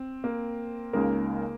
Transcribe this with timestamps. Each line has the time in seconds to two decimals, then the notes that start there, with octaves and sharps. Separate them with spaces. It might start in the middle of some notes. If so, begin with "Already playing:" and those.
Already playing: C4
0.24 A#3
0.93 C#2 C#3 G#3 A#3 D#4 A#4